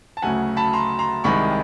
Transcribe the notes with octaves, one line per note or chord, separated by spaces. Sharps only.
A5
D2 C#3 F#3 A3 F#5 G#5
A5 B5
A#5 C6
A#5 C6
C2 C3 D#3 G#3 B5 C#6